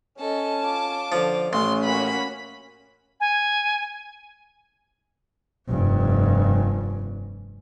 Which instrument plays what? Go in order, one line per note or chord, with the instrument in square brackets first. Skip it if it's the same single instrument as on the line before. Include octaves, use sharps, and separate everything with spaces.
[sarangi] C#4 [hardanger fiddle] A4 D#5 [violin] A5
[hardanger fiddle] F4 D6
[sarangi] D3 [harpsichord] F3
[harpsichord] A1 [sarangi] C#4 [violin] C6
[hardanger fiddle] A#3 F#4 [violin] B5
[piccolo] G#5
[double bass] F1 G2